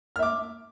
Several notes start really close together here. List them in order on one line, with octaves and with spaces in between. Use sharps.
F6 E5 D6